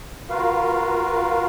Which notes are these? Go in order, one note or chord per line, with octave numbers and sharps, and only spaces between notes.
F4 F#4 A#4 B4 F5